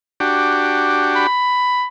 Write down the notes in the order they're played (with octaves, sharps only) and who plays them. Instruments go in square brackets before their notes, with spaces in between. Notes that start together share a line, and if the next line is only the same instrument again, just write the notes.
[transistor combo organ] D4 F#4 G4
[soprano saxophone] B5